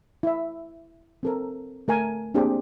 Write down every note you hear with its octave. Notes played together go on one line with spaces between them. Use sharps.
E4 E5
C4 A4 A#4
A3 A#4 G#5
A#3 C4 D4 G4 G#4